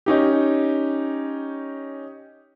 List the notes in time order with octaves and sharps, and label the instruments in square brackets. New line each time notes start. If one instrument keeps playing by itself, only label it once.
[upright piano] C#4 D#4 G4